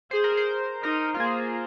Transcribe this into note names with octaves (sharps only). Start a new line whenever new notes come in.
G#4 C5
A#4
C5
D#4 A#4
F4
A#3 G#4